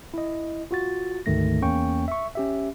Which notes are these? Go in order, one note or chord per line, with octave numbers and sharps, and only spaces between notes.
E4 D#5
F4 F#4 A6
D2 G#2 D#3 A3 A#6
E2 A#3 C#4 G5 C#6
E5 C#6
C#4 G4 E5